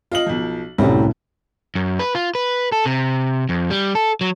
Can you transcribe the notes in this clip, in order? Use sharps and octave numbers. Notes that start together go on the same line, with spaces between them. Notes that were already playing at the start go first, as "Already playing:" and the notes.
F4 D#5 F#7
B1 F3
C2 F#2 A2 D3 F#3 G3
F#2
B4
F4
B4
A4
C3
F2
G3
A4
F#3